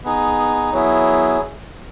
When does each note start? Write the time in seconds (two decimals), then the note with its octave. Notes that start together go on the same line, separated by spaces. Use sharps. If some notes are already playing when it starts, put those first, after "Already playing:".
0.04 B3 D#4 G#4
0.73 F#3 B3 E4 G#4